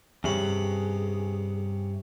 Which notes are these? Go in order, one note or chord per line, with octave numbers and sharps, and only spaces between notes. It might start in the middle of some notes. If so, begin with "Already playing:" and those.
E2 G2 C3 C#4 G#4 B5